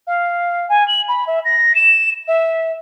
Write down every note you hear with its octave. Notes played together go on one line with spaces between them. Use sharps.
F5
G#5
F#7
B5
E5
A#6
E7
E5